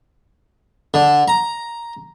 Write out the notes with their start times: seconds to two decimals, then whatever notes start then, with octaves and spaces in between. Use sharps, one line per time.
0.94 D3
1.28 A#5